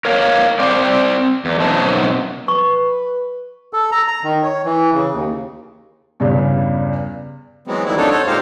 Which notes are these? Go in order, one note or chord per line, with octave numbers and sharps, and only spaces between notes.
A#4 C#5 F5
C4 C5 D5
E2
F#2 B2 C4 D#4 A5
B4 C#6
A4
A#5
A#5
D#3
C#5
E3
C#3
D#2
E2 G2 C#3
E3 F#3 G#3 B3 C4
D#3 E3 G3 A#3 C4 E4
F2 D4 D#4 F#4 A4 C#5
A4 C5 C#5
A#2 G#3 D#4 G4 C5 F5